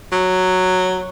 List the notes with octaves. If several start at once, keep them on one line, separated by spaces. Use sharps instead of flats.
F#3